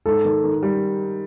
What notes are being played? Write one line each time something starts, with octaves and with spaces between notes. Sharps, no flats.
G#2 A4
D#3
D#3
G3